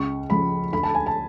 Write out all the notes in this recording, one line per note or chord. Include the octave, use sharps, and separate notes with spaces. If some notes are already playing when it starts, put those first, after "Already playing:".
Already playing: C#2 C#6
C#3 F3 B5
D2 B5
A5
G#5
A5